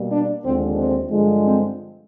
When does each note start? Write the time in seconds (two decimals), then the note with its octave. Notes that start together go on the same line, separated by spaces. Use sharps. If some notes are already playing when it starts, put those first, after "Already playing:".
Already playing: B2 G3 A#3
0.11 D4
0.44 D#2 D3 F3 G#3 C4
0.77 C4
1.11 G2 D3 F3 G#3
1.45 C4